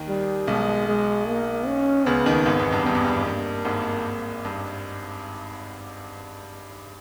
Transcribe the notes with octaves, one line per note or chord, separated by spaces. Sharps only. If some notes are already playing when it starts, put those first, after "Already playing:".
Already playing: D#2 D#3
G3
B1 B2 G#3
G#3
A#3
C#4
C#2 C#3 B3
D#2 D#3
G#1 G#2
E2
G2
G2 B3
E2
G2
A#3
G#1 G#2
G2